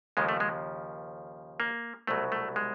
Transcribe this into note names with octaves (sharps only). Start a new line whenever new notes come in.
D#2 C#3 F3 G#3
A3
G#3
A#3
C2 B2 F#3 A3
A3
G#3